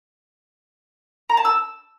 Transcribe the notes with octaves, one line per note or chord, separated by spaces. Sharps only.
A#5
A5
E6